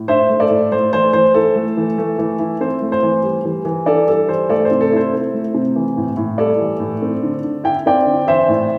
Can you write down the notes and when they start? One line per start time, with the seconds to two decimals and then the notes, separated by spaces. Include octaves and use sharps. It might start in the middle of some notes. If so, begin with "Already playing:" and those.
Already playing: A2
0.08 D4 C5 E5
0.29 A3
0.40 A4 D5
0.50 A2
0.71 A3 C5
0.93 E3 C5
1.13 E3 C5
1.34 E4 A4
1.56 A3
1.77 E3
1.98 A3
2.19 E3
2.39 E4
2.61 C4 C5
2.82 A3
2.92 C5
3.03 E3
3.23 G3
3.45 E3
3.65 E3
3.86 D4 A4 D5
4.08 G3 A4
4.28 E3 C5
4.49 A3 A4 D5
4.65 C5
4.71 C3
4.81 A4
4.92 E4 C5
5.13 C4
5.34 A3
5.54 C3
5.76 E3
5.97 A2
6.17 A2
6.38 G3 A4 D5
6.60 E3
6.80 A2
7.02 C4
7.23 D3
7.44 D3
7.64 E4 G5
7.86 C4 D5 G5
8.06 D3
8.27 E3 C5 E5
8.49 A2